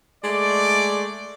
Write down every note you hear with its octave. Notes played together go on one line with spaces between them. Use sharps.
G#3 A3 D5